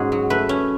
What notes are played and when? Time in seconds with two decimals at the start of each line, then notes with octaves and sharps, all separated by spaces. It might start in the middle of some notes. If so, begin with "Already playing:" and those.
Already playing: G#2 C#4 F#4 G#4
0.12 F#3
0.30 A3 B4
0.49 C#4